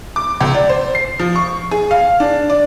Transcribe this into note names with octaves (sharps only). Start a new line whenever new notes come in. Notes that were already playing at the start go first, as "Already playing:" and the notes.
D6
C#2
D5
C5
C7
F3
C#6
G#4
F5
D4
D5